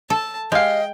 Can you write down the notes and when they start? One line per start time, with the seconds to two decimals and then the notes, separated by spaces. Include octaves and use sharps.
0.10 A4 A5
0.52 G#3 G4 D#5 F5 G5